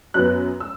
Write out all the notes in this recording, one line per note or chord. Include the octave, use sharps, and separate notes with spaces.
F#2 F#3 B3 F#6
E6